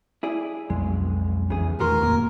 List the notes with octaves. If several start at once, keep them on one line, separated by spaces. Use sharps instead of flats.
E4 G#4 D5
B1 F2 F#3 G#3
E2 C#3 G#4
D#3 A3 B3 D4 F#4 A#4 C6
D1 F2 A#3